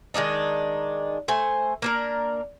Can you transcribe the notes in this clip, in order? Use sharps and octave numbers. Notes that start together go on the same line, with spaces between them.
D#3 G#3 D4 D#4
A3 C5 G#5
A#3 D4 A#4